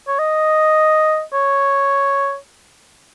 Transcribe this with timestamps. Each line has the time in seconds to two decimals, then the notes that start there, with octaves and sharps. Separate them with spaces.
0.08 C#5
0.19 D#5
1.33 C#5